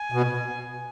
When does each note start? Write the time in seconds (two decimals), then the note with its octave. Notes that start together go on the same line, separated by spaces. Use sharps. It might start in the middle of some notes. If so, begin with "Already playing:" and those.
Already playing: G#5
0.12 B2